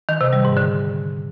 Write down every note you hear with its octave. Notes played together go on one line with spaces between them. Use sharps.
D#3
C3
G3
G#2
D3